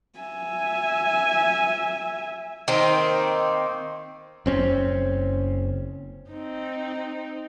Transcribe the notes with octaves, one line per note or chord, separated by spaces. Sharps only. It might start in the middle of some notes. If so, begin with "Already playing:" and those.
E5 G#5
D#3 A#3 C4
F#1 C4 C#4
C4 D#4